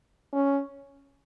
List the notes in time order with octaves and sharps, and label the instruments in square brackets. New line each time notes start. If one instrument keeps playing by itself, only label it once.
[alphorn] C#4